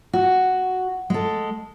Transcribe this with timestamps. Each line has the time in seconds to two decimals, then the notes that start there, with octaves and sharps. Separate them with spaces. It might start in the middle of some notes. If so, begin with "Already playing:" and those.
0.13 F#4
1.10 G#3 A4